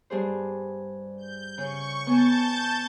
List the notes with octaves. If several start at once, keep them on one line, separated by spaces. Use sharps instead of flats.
G2 G#4 C5
G6
C#3 C#6
B3 G#5 A5 G6 A6